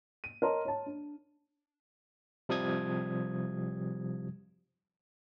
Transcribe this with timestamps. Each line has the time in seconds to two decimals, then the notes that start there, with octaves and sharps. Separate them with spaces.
0.24 D#7
0.42 A#4 C#5 D#5 A5 A#5 C6
0.65 C#5 A5
0.86 D4
2.49 C3 F3 G3 D#6 G#6